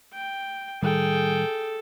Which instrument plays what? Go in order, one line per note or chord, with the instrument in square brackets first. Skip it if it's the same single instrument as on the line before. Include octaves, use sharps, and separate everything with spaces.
[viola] G5
[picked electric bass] A2 D#3 G3 [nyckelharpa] G#4 G5 [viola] A4